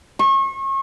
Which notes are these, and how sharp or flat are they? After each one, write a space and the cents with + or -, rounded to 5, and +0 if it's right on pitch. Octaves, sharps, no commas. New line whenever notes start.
C#6 -35